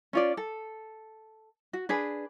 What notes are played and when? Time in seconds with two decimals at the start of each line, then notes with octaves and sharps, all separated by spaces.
0.13 C#4 F4 D5
0.37 A4
1.73 F#4
1.89 D4 G#4 B4